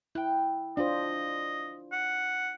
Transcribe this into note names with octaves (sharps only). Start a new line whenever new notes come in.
E4 G5 F#6
D4 F4 C5 D#5
F#5